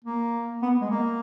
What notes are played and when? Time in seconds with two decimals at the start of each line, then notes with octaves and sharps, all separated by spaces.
0.04 A#3
0.62 B3
0.81 G#3
0.90 A#3